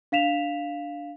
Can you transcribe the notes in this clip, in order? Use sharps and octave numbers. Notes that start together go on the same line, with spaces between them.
D4 F5 B6 E7 F7